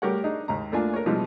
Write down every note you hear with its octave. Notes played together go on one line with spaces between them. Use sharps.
G3 A3 G4 A#4 C#5 F#5
D4 D#4 G#4
D#2 G#2 A#5
A3 A#3 D4 F4 G#5
A#4 C#5
B2 E3 F3 G3 G#3